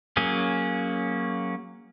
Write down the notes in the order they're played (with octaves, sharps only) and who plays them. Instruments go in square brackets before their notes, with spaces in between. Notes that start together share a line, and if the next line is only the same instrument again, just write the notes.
[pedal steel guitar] F#3 A#3 C#4 G#4